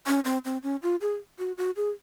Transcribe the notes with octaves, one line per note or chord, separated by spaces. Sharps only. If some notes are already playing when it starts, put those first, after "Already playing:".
C#4
C4
C4
C#4
F4
G#4
F#4
F#4
G#4